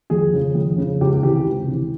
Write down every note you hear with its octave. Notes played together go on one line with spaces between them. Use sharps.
F2 G#4
C#3 F3
F2
C#3 F3
C#2 G4
C3 E3 G4
C#2
C3 E3